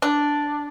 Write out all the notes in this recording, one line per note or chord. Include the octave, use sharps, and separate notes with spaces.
D4